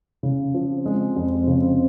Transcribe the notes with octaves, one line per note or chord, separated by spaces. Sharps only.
C#3
F3
C4
G#3
F2
C#3